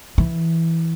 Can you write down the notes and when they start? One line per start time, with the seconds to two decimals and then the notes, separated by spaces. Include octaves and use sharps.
0.18 E3